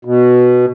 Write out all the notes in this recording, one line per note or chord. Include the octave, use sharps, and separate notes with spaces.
B2